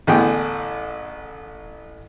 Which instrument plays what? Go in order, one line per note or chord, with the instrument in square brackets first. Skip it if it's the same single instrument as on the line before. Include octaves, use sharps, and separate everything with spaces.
[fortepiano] A1 D3 B3 G#4 G5